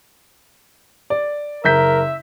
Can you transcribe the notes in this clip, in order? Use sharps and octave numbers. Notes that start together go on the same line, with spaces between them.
D5
F#1 A#4 E5 G6 B6